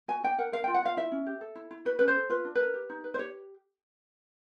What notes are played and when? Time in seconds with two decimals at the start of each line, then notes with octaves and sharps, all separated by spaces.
0.08 F#4 G#5
0.24 D4 G5
0.38 A#4 F#5
0.52 A#4 F5
0.64 F4 G5
0.74 F#5
0.83 F4 F5
0.97 E4 E5
1.12 C#4
1.26 G4
1.41 A4
1.55 E4
1.71 E4
1.85 F#4 B4
1.99 C#4 B4
2.08 C5
2.16 A4
2.29 F4 B4
2.45 D4
2.55 A#4 B4
2.74 G4
2.90 D#4
3.04 B4
3.14 C5
3.18 G4 C#5